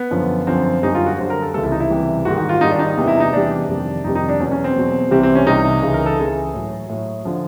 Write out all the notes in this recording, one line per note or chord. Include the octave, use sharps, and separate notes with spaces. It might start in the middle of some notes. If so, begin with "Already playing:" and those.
Already playing: B3
F#2 D3 F3
F#2 D3 F3 C4
F#2 D3 G3 D#4
F4
F#4
F#2 D3 G3 C5
A#4
A4
C#2 C3 E3 G3 A4
E4
D#4
E4
C#2 C3 E3 G3
G#2 D#3 G3 F#4
F#4
F4
G#2 D#3 G3 D#4
D4
D#4
E2 C3 E3 G3
E4
D#4
E2 C3 E3 G3 D4
F2 C3 D#3 G3
F2 C3 D#3 G3 D#4
D#4
D4
E2 B2 F#3 C#4
C#4
C4
E2 B2 F#3
C2 C3 E3 G3 C4
C4
C#4
C2 C3 E3 G3 D#4
C#2 C#3 E3
A#4
A4
C#2 C#3 E3 G#4
A2 F#3
A2 F#3
D3 F3